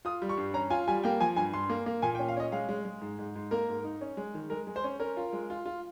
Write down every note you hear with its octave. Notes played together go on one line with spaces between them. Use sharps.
F4 D#6
G3
C#6
G2
C#4 A#5
F4 G#5
G3 G#5
A#3 G5
F3 G#5
G2 G#5
G2 C6
A#3
A#3
A#2 G#5
G5
C#4
F5
C#4 D#5
G#3 F5
G#3
G#3
G#2
G#2
G#2
A#3 A#4
G#2
D#4
C#4
G#3
D#3
G#3 A#4
G#3
C5
C#4
C#4 A#4
F4
G#3
F4
F4